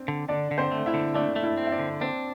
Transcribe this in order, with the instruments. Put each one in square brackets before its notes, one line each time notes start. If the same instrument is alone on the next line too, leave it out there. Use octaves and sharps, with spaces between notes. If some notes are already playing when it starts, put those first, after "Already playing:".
Already playing: [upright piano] C4 D4
[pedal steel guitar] D3
[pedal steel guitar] D3 [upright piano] D4 D5
[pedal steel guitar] D3
[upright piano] C4 C5
[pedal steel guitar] A3
[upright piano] E4 E5
[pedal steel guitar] D3
[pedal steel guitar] A3 [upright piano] D4 D5
[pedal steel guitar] A3
[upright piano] E4 E5
[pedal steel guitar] C4
[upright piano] E5
D4 D5
[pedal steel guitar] D3
[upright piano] C4 C5 [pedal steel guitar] D4